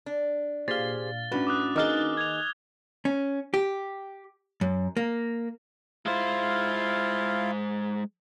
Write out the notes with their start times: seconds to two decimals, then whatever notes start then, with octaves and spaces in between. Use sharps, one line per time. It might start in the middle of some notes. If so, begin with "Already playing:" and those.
0.06 D4
0.68 A#2 G4 G#4 C5 F5 A6 G7
1.32 A2 C#4 D4 F#4 B4
1.47 D6 D#6 F#6
1.76 D#3 A#3 D#4 G#4 D6 F6 A6 G7
2.17 G#6 F7
3.05 C#4
3.54 G4
4.61 F#2
4.97 A#3
6.06 G#3 E4 F4 C5 F5